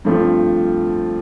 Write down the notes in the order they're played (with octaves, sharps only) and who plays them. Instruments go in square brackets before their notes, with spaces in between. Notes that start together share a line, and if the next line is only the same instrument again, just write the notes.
[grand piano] G2 F3 A3 C4